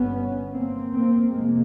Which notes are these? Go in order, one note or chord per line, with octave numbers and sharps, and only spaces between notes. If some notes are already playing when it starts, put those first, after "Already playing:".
Already playing: G1 G2 B3 C#4
A#3 C4
A#3 C4
F1 F2 C3 G#3 A#3